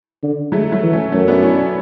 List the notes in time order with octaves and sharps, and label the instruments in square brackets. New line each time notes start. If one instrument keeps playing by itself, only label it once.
[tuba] D3
[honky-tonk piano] F#3 A3 [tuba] G#3
[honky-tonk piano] F#3 A3
[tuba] E3
[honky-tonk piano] A3 C#4
[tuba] F#2 [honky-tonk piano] A3 C#4
[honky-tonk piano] B3 D4
C#4 E4